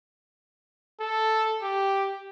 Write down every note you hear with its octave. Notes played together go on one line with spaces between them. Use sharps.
A4
G4